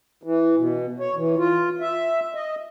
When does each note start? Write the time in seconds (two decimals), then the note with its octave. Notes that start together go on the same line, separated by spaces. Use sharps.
0.23 E3
0.57 B2
1.00 C#5
1.16 E3
1.38 F4
1.81 E5
2.35 D#5